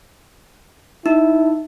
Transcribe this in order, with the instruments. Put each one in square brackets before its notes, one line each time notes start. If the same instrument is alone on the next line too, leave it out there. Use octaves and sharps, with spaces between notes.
[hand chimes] D#4 [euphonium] E4